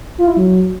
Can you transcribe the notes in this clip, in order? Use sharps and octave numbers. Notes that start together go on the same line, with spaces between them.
F4
E4
F#3